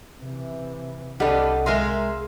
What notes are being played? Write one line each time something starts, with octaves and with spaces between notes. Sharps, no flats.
C3 E3
C2 G3 D4 G4 A4 B4 D#5 F#5
G#3 G#4 A#4 E5 F5 C6